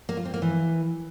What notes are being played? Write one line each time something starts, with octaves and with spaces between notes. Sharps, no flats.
A#3
F4
C4
A#3
E3